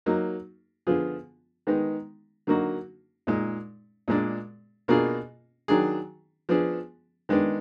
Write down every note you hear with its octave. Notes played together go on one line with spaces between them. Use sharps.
F#3 A#3 D#4
D3 F3 B3 F4 G#4
D#3 G#3 B3 D#4
D3 F#3 A#3 D#4 F#4
A#2 G#3 D#4
A#2 G#3 D4
B2 A#3 D4 F4 G#4
D#3 F#3 D4 G#4
F3 B3 D4 G#4
D#3 G#3 B3 D4